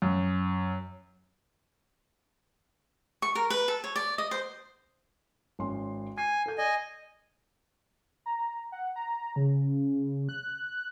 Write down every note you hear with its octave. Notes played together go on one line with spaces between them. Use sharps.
F#2
C#6
A#4
B4
A4
C#5
D5
D#5
C5
G#1 C#4 C6
G#5 G#6 C7
A4 G6
D5 D#5 G#5
A#5
F#5
A#5
C#3
F#6